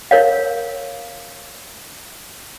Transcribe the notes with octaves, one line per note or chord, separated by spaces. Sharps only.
A#4 C#5 F5